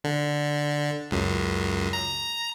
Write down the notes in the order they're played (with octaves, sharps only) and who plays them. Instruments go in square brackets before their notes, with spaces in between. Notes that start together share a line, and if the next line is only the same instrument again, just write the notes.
[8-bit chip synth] D3
C#2 F#2
A#5